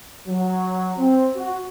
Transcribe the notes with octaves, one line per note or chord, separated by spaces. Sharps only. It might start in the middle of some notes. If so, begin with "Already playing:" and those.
F#3
C4
F#4